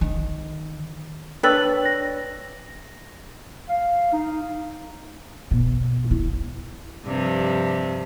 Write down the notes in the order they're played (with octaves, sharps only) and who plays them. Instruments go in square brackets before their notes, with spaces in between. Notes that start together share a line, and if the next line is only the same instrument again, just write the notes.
[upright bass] D#3
[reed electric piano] D4 C#5 D5 [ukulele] B4 [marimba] G5 E6 A6
[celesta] A#6
[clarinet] F5
D#4
[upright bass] B2
E4
[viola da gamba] G2 C3 F3